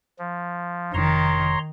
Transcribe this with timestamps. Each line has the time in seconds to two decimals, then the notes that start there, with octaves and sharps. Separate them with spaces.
0.19 F3
0.94 F1 D#3 C#5 A#5 C6